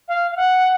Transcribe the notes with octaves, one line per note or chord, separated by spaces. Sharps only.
F5
F5
F#5